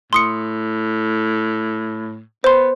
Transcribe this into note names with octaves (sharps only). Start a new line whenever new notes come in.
A2 C6 D#6 C#7
B3 C5 C6